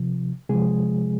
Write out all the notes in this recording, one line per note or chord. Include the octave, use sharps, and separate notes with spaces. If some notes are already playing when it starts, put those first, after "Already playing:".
Already playing: C3 F3
C3 F3 G#3 G#4